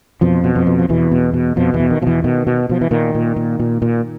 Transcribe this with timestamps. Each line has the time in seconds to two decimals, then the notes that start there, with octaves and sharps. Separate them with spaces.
0.21 F2 B2 F3
0.44 B2
0.55 F2 F3
0.67 B2
0.79 F3
0.89 E2 B2 E3
1.11 B2
1.34 B2
1.56 F2 B2 F3
1.74 E2 E3
1.80 B2
1.91 D#3
2.02 B2 F3
2.07 E2 E3
2.24 B2 D#3
2.47 B2
2.69 B2 F3
2.81 E3
2.91 A#2 D#3
3.15 A#2
3.36 A#2
3.60 A#2
3.82 A#2